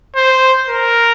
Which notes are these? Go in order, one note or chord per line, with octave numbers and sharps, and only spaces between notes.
C5
A#4